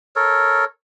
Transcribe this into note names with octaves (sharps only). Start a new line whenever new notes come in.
A4 A#4 C#5